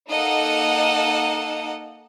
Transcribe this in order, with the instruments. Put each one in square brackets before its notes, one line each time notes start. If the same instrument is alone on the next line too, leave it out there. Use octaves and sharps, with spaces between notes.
[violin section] A#3 D#4 A4 D#5 F#5